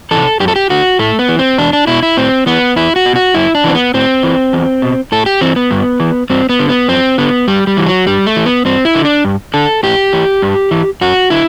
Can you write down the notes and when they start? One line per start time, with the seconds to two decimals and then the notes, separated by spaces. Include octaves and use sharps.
0.11 C3 E3 A4
0.40 F#2 G4
0.48 A4
0.56 G4
0.70 D3 F#4
0.99 A2 A3
1.19 B3
1.29 E3
1.39 C4
1.58 E2 D4
1.73 D4
1.87 B2 E4
2.03 E4
2.17 A2 C4
2.46 E3 B3
2.76 E2 E4
2.96 F#4
3.05 B2
3.16 F#4
3.34 F#2 E4
3.55 D4
3.64 E3 C4
3.75 B3
3.94 A2 C4
4.23 E3
4.53 E2
4.82 B2
5.12 A2 A4
5.26 G4
5.41 E3 C4
5.56 B3
5.71 G2
6.00 E3
6.30 G2 C4
6.49 B3
6.59 D3
6.69 B3
6.88 F#2 C4
7.18 D3 B3
7.47 G2 G3
7.67 G3
7.77 E3
7.86 F#3
8.06 G2 G3
8.26 A3
8.36 E3
8.46 B3
8.65 G2 C4
8.85 E4
8.95 D3
9.05 D4
9.25 G2
9.54 D3 A4
9.83 A2 G4
10.13 E3
10.42 G2
10.71 E3
11.01 F#2 F#4
11.30 D3 E4